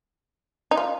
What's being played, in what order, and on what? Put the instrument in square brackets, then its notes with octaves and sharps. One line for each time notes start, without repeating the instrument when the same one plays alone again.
[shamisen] D#4
F4